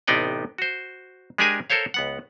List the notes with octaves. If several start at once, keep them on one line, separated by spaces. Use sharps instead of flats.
A1 C3 B3 D#4 D5 G5
F#4 C5
G#3 D4 G4 G#4 A#4 G#5
A4 A#4 C5 C#5 F5
C#2 B3 F#5